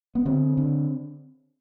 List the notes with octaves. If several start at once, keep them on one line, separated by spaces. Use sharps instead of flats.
B3
D3 C4
D3